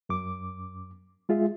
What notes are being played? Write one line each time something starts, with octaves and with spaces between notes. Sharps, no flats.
F#2 D6
G#3 F4 G#4 E5